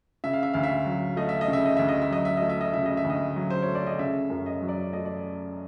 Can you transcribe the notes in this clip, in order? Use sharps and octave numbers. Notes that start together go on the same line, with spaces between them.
C#3 E5
F5
E5
D2 F5
E5
F#3
A3 D#5
E5
D#5
C#3
E5
D#5
D2 E5
D#5
E5
F#3 D#5
E5
A3 D#5
E5
D#5
C#3 E5
D#5
E5
D2
D#5
F#3
C5
A3 C#5
D5
D#5
C#3 E5
F#2
D#5
F#3
D5
A3 D#5
D5